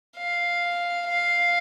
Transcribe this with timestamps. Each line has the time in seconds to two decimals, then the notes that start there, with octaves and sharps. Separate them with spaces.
0.17 F5
1.08 F5